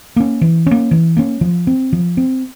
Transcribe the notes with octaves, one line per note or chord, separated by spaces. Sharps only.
A#3 C#4
E3
A#3 C#4
E3
A#3 C#4
F3
C4
F3
C4